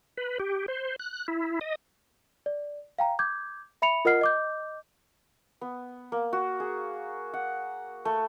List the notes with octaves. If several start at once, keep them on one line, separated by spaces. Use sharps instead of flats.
B4
G4
C5
F#6
E4
D#5
D5
F5 G5 A#5
D6 G6 G#6
E5 B5 C#7 F7
F4 A#4 D#5 F#5 F6 C7
D#5 D6 G6
B3
A#3
F#4
G#4
F#5
A3